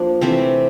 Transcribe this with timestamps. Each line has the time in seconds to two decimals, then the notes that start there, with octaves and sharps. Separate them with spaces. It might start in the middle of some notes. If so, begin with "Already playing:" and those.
Already playing: F3 A#3 D4
0.21 C3 E3 A3 C4